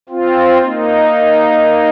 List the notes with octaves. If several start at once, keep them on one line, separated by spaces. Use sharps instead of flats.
C4 F4
A#3 D#4